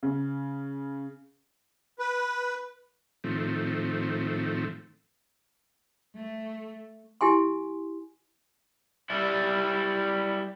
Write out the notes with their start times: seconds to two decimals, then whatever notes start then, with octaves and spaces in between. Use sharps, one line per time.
0.03 C#3
1.99 B4
3.24 A2 D#3 F3 A3 C4
6.16 A3
7.21 E4 G4 G#5 C6
9.10 G3 E4